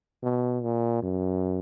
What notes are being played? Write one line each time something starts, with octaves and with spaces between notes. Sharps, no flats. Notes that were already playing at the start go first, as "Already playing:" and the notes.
B2
A#2
F#2